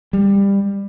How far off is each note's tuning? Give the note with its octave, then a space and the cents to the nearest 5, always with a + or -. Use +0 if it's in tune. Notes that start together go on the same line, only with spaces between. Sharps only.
G3 +20